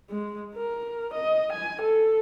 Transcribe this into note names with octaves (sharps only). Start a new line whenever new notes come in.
G#3
A#4
D#5
G#5
A4